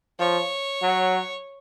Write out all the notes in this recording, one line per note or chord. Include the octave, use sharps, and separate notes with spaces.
F3 C#5
F#3